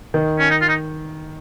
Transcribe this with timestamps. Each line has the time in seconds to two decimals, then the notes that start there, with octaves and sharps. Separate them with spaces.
0.14 D#3
0.39 C#4
0.50 D#4
0.61 F4
0.69 D#4